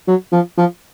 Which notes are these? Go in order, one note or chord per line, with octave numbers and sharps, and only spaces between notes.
F#3
F3
F3